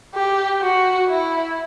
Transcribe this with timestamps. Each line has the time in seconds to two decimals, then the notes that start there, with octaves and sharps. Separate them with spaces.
0.15 G4
0.62 F#4
1.09 E4